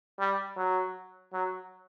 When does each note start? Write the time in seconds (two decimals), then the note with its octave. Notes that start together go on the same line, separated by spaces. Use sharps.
0.19 G3
0.57 F#3
1.33 F#3